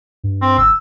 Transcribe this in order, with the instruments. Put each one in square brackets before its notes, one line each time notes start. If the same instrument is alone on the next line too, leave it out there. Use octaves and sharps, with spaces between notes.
[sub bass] G2
[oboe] C4
[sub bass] F#1 [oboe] E6